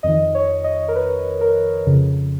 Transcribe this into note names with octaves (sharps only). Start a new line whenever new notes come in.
F2 D#3 D#5
C#5
D#5
A#4
B4
A#4
F2 C#3